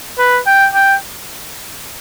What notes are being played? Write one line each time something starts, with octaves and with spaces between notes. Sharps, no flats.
B4
G5
G5